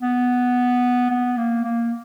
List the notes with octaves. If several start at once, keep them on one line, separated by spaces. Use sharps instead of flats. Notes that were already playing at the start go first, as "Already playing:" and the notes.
B3
B3
A#3
A#3